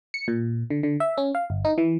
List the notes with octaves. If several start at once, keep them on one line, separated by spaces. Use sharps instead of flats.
C#7
A#2
D3
D3
E5
C#4
F5
G1
D#4
E3